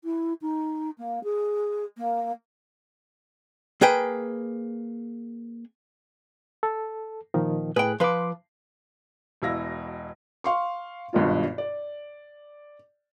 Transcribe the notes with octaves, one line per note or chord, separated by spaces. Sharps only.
E4
D#4
A#3
G#4
A#3
A#3 G#4 B4 G5
A4
A#2 D#3 F3
A2 G#4 B4 G5 F#6
F3 B4 C6 D6
E1 B2 E4 F5 A#6
F5 C6 C#6
G#1 G2 B2 F4
D5